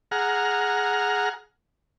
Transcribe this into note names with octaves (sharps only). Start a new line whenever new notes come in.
G#4 F#5 A#5 F6